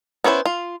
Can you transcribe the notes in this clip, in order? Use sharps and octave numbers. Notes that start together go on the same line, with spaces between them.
B3 C#4 E4 B4 C5
F4